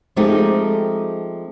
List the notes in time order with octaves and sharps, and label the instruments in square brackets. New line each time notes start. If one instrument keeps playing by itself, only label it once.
[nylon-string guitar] F3 G#3 A3 C4 D#4 G4